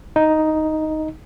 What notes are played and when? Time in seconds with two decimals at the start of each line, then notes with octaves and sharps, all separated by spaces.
0.16 D#4